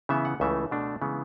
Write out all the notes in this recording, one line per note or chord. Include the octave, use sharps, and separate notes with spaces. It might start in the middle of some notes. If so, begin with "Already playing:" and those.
C#3 E3 B3 E5
F#5
C#2 C#3 E3 A3 E5
B2 A3 D4
C#3 E3 G#3 B3